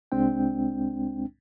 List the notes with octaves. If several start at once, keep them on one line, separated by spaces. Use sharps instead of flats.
C2 G#3 C4 D4 G5